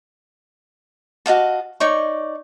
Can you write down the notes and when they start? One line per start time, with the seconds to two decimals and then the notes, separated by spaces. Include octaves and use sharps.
1.26 F#4 D#5 F5 A5
1.80 D#4 C#5 D5 C#6